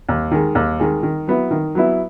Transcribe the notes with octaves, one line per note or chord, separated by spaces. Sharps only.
D#2
D#3 G#3
D#2
D#3 G#3
D#3
F#3 B3 E4
D#3
F#3 B3 E4